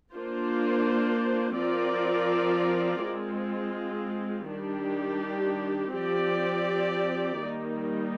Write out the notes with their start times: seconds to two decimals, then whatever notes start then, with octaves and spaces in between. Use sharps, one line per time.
0.13 A#3 D4 F4 C5
1.58 F3 C4 F4 A#4 D5
3.04 G#3 C4 F4
4.51 D#3 G3 D4 G4
5.96 F3 C4 G4 D5
7.43 D#3 G3 A#3 D#4